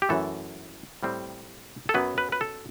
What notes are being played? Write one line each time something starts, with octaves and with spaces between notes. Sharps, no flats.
G4
F#2 E3 A3 A4
A2 G3 C4
A4
F#2 F#3 B3 B4
B4
B4
A4